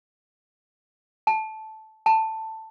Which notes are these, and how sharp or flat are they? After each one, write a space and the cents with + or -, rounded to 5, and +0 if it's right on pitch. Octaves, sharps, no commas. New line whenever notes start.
A5 -10
A5 +10